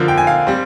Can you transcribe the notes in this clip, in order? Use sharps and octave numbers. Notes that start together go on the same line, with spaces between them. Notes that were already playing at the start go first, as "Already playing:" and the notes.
Already playing: D3 F3 A#3
G5
G#5
F5
G3 C4